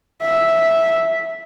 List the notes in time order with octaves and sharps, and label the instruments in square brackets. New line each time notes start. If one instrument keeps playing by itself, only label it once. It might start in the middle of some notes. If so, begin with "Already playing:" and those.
[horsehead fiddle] E5